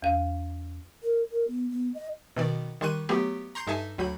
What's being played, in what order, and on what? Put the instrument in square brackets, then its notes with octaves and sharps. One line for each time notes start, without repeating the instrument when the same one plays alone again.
[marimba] E2 F5
[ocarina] A#4
A#4
B3
B3
D#5
[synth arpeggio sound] B2 D#3 D5
D#3 G3 C6 C#6 F#6 D#7
F#3 A3 B3 G4
A#5 C6 G6 C7
G2 D#4 A4 E5 G#5 A5
D2 F#3 B5 G6